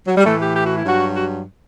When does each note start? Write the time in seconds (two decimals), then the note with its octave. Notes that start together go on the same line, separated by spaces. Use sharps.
0.07 F#3
0.17 G3
0.25 A2 E3 A3
0.40 G4
0.54 G4
0.66 F#4
0.77 E4
0.85 G2 F#3 F#4
1.14 F#4